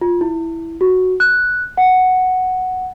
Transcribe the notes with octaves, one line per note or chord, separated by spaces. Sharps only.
F4
E4
F#4
F#6
F#5